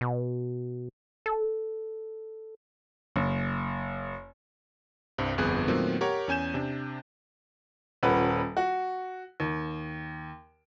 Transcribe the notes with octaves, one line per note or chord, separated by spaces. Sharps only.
B2
A4
F#1
C2 G2 C4
G1 F2 B3 G#4 F#6
A#2 D#3 F#3 A3 B3 C4
G4 A#4 C#5 F#5
E2 C#4 G#5 G6 E7
C3 D4
D#1 A#2 C#4 B4 F#5
F#4
D#2